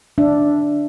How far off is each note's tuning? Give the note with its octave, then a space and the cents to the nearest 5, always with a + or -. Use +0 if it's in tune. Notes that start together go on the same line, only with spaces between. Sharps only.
D4 +0 E5 +15